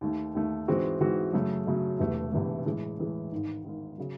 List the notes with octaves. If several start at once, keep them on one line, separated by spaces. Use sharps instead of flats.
D#2 D#3 A3
D#2 D#3 A3
G#2 E3 G#3 C4 F#4
G#2 E3 G#3 C4 F#4
F#2 C#3 F#3 A3
F#2 C#3 F#3 A3
E1 E2 C3 E3 A3
E1 E2 C3 E3 A3
A2 E3 G#3
A2 E3 G#3
G#1 G#2 D#3
G#1 G#2 D#3
C#3 F#3